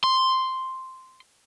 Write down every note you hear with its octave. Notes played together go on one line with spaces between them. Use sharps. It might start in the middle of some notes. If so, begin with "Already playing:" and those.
C6